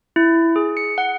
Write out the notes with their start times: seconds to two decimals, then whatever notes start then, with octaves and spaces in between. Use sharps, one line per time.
0.16 E4
0.56 G#4
0.77 C#7
0.98 F#5